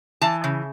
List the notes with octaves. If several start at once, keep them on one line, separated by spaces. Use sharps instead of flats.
E3 A5
C#3